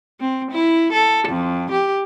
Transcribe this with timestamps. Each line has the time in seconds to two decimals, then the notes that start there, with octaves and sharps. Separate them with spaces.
0.20 C4
0.51 E4
0.93 A4
1.29 F2
1.71 G4